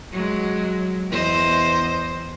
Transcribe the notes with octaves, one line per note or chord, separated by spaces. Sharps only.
F#3 G#3
E2 C5 D#5